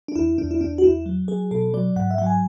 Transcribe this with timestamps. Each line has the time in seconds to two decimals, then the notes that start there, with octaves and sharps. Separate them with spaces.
0.08 D4
0.16 E2 E4
0.38 E2 D4
0.51 E4
0.61 E2 D4
0.78 F#4
0.83 E2 E4
1.06 F#3
1.28 F#3 G#4
1.51 B2 A4
1.74 F#3 D5
1.96 G#2 F#5
2.11 E5
2.18 F#3 F#5
2.26 G#5